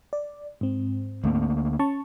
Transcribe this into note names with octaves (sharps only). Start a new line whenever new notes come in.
D5
G#2 C4
D2 A3 A#3
C#4 A5 C#6